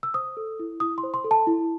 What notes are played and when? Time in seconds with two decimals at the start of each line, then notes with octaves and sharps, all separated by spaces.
0.03 E6
0.14 C5 D#6
0.37 A4
0.59 E4
0.80 E4 D#6
0.98 C6
1.03 C5
1.14 C6
1.24 A4
1.31 A5
1.47 E4